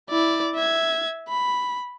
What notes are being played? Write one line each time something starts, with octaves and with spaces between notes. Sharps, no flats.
E4 D5
E5 G#6
B5